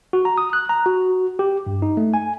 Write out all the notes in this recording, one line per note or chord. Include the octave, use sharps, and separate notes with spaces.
F#4
A#5
D#6
F#6
A#5
F#4
G4
G2
D#4
A3
G#5